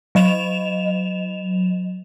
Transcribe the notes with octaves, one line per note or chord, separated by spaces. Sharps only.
F#3 D#5 E7 F7